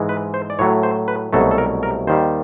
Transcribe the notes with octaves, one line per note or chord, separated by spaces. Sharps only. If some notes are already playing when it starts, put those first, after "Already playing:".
Already playing: G#2 E3 G#3
B4
C5
D5
A2 F#3 A3 C#5
C5
B4
C2 B2 F#3 A3 A4
A4
A#4
A#4
D#2 D#3 G3 C5